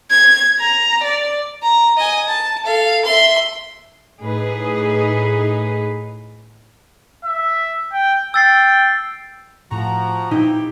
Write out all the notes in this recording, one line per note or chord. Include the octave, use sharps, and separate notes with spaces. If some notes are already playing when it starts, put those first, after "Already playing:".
G#6
A#5
D5
A#5
D#5 G#5
A5
A4 F5
E5 C6
A2 D#4 G#4 B4
E5
G5
G5 E6 A6 C7
A2 F3 F#4 A#5
A#2 E3 C4 D#4 G4